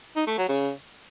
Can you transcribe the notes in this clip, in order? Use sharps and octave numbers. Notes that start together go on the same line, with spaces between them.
D#4
A3
F#3
C#3